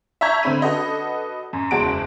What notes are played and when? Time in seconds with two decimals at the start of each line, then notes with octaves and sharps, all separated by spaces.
0.21 E5 A5 A#5 C#6 G6 G#6
0.43 D3 A3 C4 B5 D#7
0.62 D4 F#4 A4 B4 D#5
1.53 F#2
1.71 F#1 E2 G#3 F#4 A5 D7